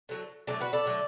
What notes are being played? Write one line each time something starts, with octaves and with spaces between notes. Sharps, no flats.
D3 F#3 A3
D3 F#3 A3 A4 D5
F#4 B4
A4 D5
D3 F#3 A3